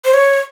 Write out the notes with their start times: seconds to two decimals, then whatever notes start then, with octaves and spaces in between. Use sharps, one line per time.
0.05 C5
0.14 C#5